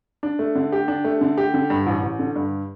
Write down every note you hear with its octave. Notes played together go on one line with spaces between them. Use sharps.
D4
A3
D3
G4
D4
A3
D3
G4
D3
G2
A1
A1
D3
G2